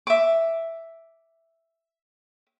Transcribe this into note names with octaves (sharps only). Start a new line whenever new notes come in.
E5 D6